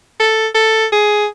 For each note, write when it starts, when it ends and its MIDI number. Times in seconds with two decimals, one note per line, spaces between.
0.20 0.47 69
0.55 0.85 69
0.92 1.26 68